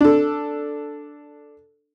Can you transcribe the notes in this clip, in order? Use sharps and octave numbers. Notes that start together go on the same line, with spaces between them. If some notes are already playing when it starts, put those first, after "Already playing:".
D4 A4